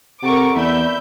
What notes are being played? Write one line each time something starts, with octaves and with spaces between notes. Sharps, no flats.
C3 C4 A4 A#4 F#5 C#6 D6
E2 B3 D5 E5 B5 G6